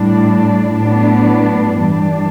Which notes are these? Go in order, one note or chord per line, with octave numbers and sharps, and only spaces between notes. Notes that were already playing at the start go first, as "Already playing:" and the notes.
Already playing: A2 G3 D4
A2 F#3 B3 D4
G2 E3 G3 D4